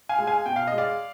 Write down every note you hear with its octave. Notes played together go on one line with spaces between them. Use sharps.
F5 G#5
G#3
F5 G#5
B2 G5
F5
G#3 D#5
D5 F5